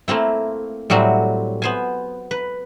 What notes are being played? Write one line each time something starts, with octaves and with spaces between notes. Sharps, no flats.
A3 A#3 C4 E4
A2 F#3 G3 C4 F#4
B3 C5 G#5
B4